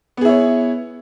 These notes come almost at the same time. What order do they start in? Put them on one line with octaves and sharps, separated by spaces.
B3 G#4 E4 C#5